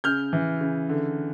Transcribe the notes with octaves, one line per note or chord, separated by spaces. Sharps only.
C#3 F6 G6
E3
C#3
D3